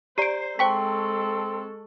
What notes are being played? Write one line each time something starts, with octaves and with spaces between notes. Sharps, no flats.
G4 C5 D5 A#5 C7 D7
G#3 C4 A4 C5 G5 A5 C#6 B6